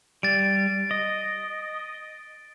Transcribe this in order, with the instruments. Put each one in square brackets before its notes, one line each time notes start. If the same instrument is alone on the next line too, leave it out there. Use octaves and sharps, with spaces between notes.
[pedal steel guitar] G3 [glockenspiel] A6 D7
[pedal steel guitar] D#5